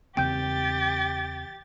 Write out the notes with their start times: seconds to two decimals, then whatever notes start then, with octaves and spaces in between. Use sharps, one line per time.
0.17 E2 C#3 C4 G4 G5 G6 A6